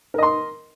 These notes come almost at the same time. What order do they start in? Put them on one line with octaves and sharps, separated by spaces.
A#4 D#5 C6